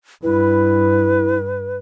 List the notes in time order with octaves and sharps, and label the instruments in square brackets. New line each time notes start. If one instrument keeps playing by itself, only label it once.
[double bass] G2 [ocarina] E4 [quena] B4